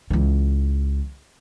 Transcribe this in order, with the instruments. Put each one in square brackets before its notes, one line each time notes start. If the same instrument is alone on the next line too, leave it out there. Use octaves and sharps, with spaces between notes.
[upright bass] C#2 E3